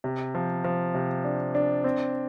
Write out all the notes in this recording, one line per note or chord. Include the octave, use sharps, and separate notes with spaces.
C3
F3
F3
C3
D4
D4
C4